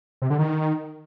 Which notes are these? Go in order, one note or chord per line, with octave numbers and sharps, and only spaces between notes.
C3
D3
D#3